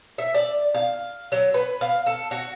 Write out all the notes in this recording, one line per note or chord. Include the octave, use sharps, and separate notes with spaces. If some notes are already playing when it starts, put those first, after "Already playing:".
E5
D5
F5
F#3
B4
F5
A4
F#4